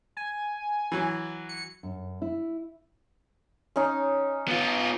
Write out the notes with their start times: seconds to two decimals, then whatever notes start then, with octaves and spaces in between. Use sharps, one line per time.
0.17 G#5
0.92 E3 F#3
1.49 C#7
1.83 F#2
2.22 E4
3.76 C#4 D#4
4.48 B3 F4